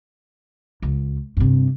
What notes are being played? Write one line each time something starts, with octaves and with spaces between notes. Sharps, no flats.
C#2
G2 C3